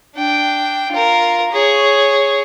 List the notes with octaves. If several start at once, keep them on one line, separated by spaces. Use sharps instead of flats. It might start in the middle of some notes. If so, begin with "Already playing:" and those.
D4 G5
F4 A#4
G#4 C#5